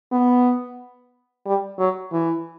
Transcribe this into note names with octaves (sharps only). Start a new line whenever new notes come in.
B3
G3
F#3
E3